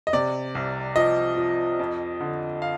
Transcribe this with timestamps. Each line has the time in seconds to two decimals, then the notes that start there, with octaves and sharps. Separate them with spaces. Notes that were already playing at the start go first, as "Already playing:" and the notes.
0.07 D#5
0.13 C3 D5
0.55 C2
0.96 F3 D#5
1.37 F3
1.79 F2
2.20 D3
2.62 F5